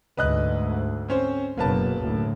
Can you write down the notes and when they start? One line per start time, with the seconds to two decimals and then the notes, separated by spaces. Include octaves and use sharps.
0.17 D2 G#2 B4 D#5 F#6
1.09 C4 C#4 C5
1.57 F#1 F#2 B2 A#3 B4 A5
2.01 D2 A2